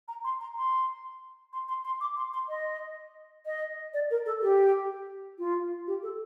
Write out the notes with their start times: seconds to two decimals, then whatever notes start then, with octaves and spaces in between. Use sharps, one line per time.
0.08 A#5
0.24 C6
0.41 A#5
0.56 C6
1.53 C6
1.68 C6
1.85 C6
2.01 D6
2.17 C6
2.33 C6
2.49 D#5
3.46 D#5
3.94 D5
4.11 A#4
4.26 A4
4.42 G4
5.39 F4
5.87 G4
6.03 A4